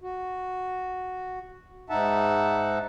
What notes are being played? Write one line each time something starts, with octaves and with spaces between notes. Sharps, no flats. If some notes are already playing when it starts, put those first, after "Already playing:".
F#4
G#2 D#4 E5 F#5 A5